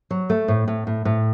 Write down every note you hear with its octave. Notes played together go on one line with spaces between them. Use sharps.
F#3
A3
A2
A2
A2
A2